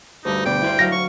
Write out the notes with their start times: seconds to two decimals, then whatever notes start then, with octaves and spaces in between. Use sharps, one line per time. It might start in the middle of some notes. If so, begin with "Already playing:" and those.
0.25 D2 G2 D#4
0.46 B2 D3 D5 G5
0.62 E4 B4 C5
0.79 F#3 F5 A#6
0.92 C#6